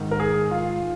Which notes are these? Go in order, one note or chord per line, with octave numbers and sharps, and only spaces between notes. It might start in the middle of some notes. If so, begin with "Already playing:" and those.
Already playing: G#2 D#3
A#4
G#4
F4